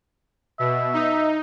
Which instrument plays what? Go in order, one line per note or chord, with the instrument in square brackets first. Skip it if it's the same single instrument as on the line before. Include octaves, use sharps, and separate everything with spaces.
[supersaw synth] B2 [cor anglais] E5
[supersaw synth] D#4